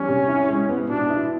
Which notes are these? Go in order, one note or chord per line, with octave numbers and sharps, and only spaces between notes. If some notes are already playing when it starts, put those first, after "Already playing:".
Already playing: E2 E3 G3 C#4
C3
E4
G#3
B3
B2 D4
E4